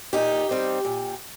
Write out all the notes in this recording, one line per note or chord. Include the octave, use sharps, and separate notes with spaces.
A#2 D#4 G4
G3 C4 D#4
A#2